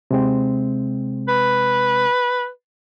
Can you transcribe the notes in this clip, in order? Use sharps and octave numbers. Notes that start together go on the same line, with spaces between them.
C3 G#3 C4
B4